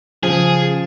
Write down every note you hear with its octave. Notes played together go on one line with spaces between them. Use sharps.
C#3 F3 G#4